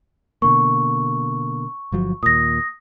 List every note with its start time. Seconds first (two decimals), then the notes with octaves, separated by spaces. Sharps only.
0.42 B2 D3 A#3 C#6
1.92 G1 F3 F#3
2.23 D#2 A#2 D#6 A#6